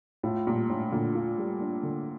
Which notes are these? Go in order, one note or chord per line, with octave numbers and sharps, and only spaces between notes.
A2 F4
A#2 G3
A2 D4
A#2 D3
F4
G3
D4
D3